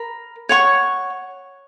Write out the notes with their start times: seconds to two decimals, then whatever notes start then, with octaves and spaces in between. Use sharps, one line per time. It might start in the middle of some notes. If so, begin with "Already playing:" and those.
Already playing: A#4 B5
0.49 C#5 F#5 C#6